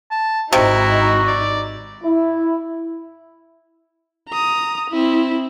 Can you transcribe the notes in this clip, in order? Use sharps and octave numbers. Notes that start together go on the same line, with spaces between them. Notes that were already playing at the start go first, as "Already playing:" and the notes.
A5
G#1 C3 D#4 E4 F#4
D5
E4
A#5 D#6
C4 E4